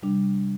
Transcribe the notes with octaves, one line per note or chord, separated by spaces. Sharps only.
C3 G3 D4